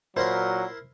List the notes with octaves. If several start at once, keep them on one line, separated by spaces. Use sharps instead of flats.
A#2 F#3 E4 A#4 C5 C6